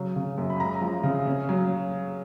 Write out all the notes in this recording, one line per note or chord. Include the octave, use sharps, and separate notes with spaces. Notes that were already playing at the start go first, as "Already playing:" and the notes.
Already playing: C#3 F#3
C#3
F#2
B5
G#3 A#5
F3
C#3
C#4
F#3